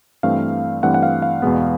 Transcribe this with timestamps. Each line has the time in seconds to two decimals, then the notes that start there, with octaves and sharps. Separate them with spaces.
0.23 G2 E3 A3 C4 F5
0.83 G2 E3 A3 C4 F#5
0.94 F#5
1.03 F5
1.22 F5
1.42 E2 B2 G#3 B3